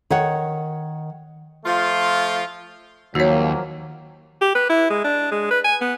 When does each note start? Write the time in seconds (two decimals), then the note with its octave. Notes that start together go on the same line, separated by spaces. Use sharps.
0.10 D#3 C#5 F#5
1.65 F3 A3 F4
3.15 D#2 F3 F#3 A#3 F#4 C#5
4.41 G4
4.55 B4
4.69 E4
4.90 G#3
5.04 D4
5.32 G#3
5.51 B4
5.65 G#5
5.81 B3